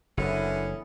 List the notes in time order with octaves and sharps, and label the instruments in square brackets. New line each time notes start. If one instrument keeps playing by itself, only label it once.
[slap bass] F#1 [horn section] D3 A3 C#4 [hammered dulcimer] E3 B3